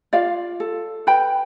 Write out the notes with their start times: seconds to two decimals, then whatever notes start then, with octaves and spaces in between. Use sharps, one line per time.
0.13 F4 D5 F5
0.60 A4
1.07 B4 G5 B5